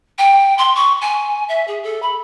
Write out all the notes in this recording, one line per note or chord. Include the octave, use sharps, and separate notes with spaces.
G5
C6
C#6
G#5
E5
G#4
A4
B5